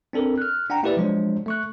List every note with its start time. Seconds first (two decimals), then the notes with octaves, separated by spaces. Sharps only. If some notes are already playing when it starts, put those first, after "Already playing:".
0.13 C4 D4 A4 A#4
0.38 F6 F#6
0.69 D4 F#5 G5 A#5
0.83 A#3 E4 G4 B4 D5 E5
0.97 F3 F#3 G#3 D4 C5 C#5
1.46 A3 C#6 F#6